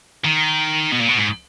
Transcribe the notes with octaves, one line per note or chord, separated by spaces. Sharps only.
D#3
B2
A#2
B2
G#2